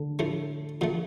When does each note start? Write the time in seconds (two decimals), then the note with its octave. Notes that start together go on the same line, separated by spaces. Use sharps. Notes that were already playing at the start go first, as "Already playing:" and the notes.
Already playing: D3
0.19 A2 F3 A3
0.81 A#2 F3 A3